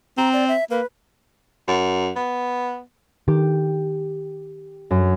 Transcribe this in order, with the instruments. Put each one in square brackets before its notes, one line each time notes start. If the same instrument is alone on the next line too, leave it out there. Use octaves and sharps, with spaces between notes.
[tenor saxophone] C4 [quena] A#5
[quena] D5
E5
[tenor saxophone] A#3 [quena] B4
[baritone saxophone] F#2
B3
[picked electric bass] D#3 [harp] G4
[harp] F#2